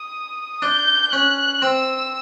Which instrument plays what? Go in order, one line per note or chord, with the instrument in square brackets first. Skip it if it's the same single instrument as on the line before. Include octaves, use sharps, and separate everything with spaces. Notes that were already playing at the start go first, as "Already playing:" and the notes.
Already playing: [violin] D#6
[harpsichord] D4 [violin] G6
[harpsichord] C#4 [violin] F#6
[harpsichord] C4 [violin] E6